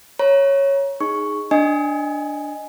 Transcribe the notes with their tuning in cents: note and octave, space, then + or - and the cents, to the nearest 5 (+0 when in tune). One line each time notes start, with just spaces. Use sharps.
C#5 -5 A#5 +25
D#4 +0 G#4 +0 C#6 +0
D4 +0 D#5 +0 G#5 +0